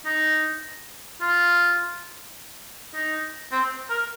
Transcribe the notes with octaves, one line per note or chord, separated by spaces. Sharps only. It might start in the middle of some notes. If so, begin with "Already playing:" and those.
D#4
F4
D#4
C4
A#4